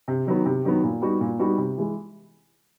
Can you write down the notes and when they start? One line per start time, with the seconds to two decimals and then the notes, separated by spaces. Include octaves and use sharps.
0.08 C3
0.27 D#3 F#3 B3
0.46 C3
0.65 D#3 F#3 B3
0.84 A#2
1.02 G3 B3 D#4 F#4
1.21 A#2
1.39 G3 B3 D#4 F#4
1.58 C3
1.78 E3 G#3